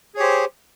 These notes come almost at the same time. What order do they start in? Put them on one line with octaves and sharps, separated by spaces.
G#4 C#5 G4 C5